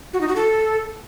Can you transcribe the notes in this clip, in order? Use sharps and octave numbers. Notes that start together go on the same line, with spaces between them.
F#4
D#4
F#4
A4